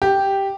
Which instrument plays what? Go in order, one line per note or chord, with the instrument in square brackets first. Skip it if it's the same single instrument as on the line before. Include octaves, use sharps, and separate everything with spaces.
[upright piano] G4